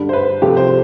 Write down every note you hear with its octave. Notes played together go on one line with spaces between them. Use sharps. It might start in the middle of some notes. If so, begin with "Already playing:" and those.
Already playing: G2 D3 G3
C5
B4
C2 C3 F3 A3 G4
C5